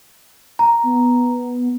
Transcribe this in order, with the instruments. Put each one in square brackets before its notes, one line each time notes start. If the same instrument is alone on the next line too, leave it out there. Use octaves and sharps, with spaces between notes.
[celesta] A#5
[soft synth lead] B3